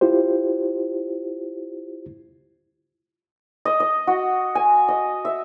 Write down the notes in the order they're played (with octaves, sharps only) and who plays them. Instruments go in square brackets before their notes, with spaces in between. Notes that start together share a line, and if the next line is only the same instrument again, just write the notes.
[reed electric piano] E4 F4 G4 C5
[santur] D#5
D#5
F#4
G#5
D#5
E5